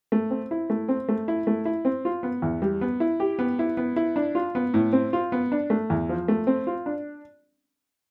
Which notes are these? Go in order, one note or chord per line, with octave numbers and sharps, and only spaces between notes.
A3
C4
E4
A3
C4
A3
E4
A3
E4
C4
F4
B3
E2
G3
B3
E4
G4
B3
E4
B3
E4
D4
F4
B3
A2
C4
F4
B3
D4
A3
E2
F3
A3
C4
F4
D4